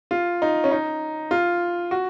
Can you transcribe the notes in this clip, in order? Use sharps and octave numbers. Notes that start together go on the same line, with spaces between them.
F4
D#4
C#4
D#4
F4
F#4